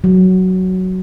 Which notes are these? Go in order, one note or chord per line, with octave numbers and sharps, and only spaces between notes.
F#3